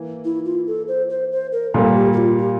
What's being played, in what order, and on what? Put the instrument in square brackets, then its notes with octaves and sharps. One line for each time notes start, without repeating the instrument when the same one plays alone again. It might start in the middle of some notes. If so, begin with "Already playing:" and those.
Already playing: [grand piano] E3 A#3
[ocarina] E4
F4
A4
C5
C5
C5
A#4
[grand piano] A#2 G3 A#3 [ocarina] A4
[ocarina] G4
G4
F4
G4